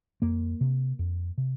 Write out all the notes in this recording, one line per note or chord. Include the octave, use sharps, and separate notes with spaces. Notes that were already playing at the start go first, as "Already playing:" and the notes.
F2 A#3
C3
F2
C3